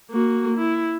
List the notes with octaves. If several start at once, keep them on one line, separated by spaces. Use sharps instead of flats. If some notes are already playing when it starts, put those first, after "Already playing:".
A#3 F#4
E4